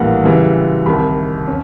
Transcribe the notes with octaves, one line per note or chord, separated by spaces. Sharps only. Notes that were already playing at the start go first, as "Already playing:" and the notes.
Already playing: A#1 A2 E3 G3 A#3 F5 F#5
F#2 C#3 E3 G3
C2 C3 D#3 B5
C#4